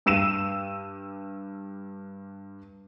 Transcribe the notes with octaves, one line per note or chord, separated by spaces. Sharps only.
G2 E6 D#7 E7